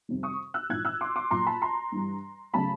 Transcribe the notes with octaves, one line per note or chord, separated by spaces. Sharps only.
F2 C3 D#3 G3
C#6 D#6
E6 F#6
A#1 G#2 E3 F#6 G#6
E6 F#6
C6 D6
C6 D6
A#1 A#2 F#3 A#5 C6
A5 B5
A#5 C6
G2 E3 G3
C#3 F#3 A3 A5 B5